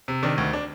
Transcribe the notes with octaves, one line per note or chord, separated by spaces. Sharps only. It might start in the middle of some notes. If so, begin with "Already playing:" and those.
C3
D#3 D4
D2
D4